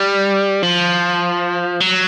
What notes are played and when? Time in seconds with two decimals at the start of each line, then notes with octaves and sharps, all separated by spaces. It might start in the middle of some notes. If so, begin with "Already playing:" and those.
Already playing: G3
0.63 F3
1.81 F#3